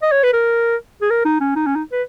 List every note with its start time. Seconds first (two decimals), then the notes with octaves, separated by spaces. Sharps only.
0.02 D#5
0.12 C#5
0.23 B4
0.33 A#4
1.02 G#4
1.10 A#4
1.25 D#4
1.41 C#4
1.56 D#4
1.66 C#4
1.76 D#4
1.92 B4